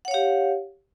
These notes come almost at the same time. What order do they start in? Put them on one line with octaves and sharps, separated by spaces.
F#5 C#5 F5 G4